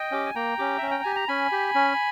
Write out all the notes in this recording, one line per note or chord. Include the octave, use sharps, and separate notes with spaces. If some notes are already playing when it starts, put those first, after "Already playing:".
Already playing: D#5 G5
C#4 G4
G#5
A#3 G5 A#5
C#4 G4
C#4 E5
G5
G4 G#5
A#5
C#4 G#5 B5
G4
C#4